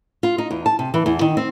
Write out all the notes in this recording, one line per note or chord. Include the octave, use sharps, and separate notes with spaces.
F4
D#4
E2
A5
C3
E3
E2
D#3
C4